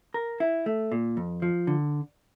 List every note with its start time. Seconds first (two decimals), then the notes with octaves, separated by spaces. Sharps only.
0.14 A#4
0.40 E4
0.66 A3
0.92 A#2
1.17 F2
1.42 F3
1.67 D3